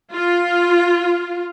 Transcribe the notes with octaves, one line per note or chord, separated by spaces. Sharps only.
F4